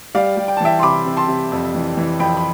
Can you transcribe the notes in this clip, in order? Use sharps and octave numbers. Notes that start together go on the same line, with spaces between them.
G3 D5 F5
G3
G5
A5
E3 E5 G5
C6
C3 B5 D6
C3
A5 C6
C3
F2
E3
E3
F2 G5 B5
B5